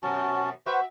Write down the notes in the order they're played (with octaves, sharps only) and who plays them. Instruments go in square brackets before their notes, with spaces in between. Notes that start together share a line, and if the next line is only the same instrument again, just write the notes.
[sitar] F#2 B2 [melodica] C#4 F#4 A5
[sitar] F#4 E5 [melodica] B4 C5 C#6